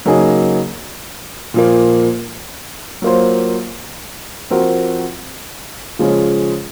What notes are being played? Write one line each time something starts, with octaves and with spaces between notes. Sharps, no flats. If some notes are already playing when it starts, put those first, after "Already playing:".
C#3 F#3 A#3 D#4 G#4
A#2 F3 A#3
F#3 A#3 F4 C5
F3 C4 F#4 A#4
C#3 F3 G#3 C#4 G#4